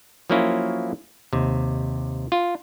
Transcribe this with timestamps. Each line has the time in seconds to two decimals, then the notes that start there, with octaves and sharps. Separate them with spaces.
0.30 F3 F#3 A#3 C#4 E4 F4
1.33 D#2 C3
2.32 F4